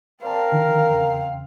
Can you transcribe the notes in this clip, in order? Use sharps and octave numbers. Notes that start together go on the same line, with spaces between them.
C4 A#4 C5 D5 F5 A5
D3 D#3 F3
E2 C#3